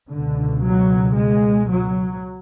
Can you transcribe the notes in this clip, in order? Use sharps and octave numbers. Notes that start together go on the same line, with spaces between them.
C#2 B2 D3
F#3
G#3
F#3